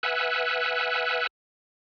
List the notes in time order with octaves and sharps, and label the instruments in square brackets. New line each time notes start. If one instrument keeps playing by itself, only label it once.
[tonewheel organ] B4 E5 F#5 G#5 E6 F#6